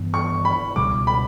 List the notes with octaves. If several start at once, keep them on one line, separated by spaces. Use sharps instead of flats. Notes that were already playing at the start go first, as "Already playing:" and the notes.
Already playing: G2 E3 B3
C#6
B5
C#2 B2 G3 D6
B5